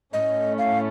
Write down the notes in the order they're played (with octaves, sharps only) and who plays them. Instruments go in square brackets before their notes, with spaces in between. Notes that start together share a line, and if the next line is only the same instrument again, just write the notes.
[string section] A2 A3 C#4 [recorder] D#5
[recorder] F5